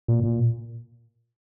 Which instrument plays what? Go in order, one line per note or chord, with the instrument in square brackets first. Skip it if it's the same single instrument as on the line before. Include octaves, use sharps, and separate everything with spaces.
[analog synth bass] A#2
A#2